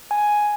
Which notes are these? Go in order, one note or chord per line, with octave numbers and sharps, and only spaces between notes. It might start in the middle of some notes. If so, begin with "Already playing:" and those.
G#5